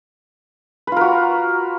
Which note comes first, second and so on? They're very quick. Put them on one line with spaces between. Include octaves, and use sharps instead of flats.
B4 F4 A#4 F#4